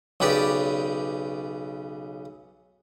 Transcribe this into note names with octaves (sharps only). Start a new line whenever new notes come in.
B1 C#3 G4 B4 D5